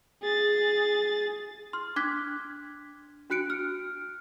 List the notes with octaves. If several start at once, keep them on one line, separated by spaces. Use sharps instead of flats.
G#4 A6
C6 F6
D4 D6 F#6 G#6 B6
D4 F#4 F#6 C#7 D7
F6